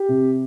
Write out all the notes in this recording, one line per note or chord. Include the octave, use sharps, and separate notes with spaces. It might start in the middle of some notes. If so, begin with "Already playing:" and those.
Already playing: G4
C3